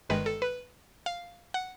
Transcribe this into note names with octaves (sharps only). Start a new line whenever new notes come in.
G1 G2 D#3 G#3 B4
A4
B4
F5
F#5